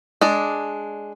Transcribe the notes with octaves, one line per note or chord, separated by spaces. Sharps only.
G#3 D4 D5